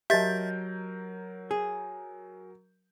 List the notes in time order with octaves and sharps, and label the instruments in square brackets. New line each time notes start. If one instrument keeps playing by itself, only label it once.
[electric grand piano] F#3 A#4 G6 [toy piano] G4 D#5 A5 [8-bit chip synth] E5 A6
[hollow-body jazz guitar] G#4